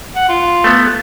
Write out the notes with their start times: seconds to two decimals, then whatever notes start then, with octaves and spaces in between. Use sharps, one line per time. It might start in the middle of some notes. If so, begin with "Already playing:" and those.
0.16 F#5
0.29 F4
0.64 A3 B3